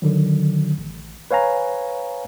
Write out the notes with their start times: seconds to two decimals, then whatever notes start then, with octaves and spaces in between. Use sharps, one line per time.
0.02 D3 D#3 F#3
0.78 A1
1.31 B4 C#5 F5 G#5 A#5